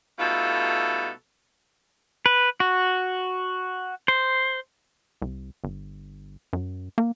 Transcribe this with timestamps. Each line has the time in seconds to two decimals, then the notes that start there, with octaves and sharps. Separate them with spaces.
0.19 B2 G3 A3 D#4 F4 A4
2.26 B4
2.60 F#4
4.08 C5
5.22 C2
5.64 G1
6.53 F#2
6.98 A#3